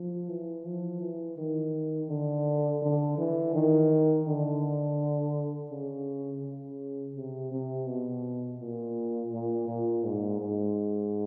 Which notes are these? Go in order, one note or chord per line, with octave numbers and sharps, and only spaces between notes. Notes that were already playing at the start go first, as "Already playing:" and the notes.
Already playing: F3
E3
F3
E3
D#3
D3
D3
E3
D#3
D3
C#3
C#3
C3
C3
B2
A#2
A#2
A#2
G#2
G#2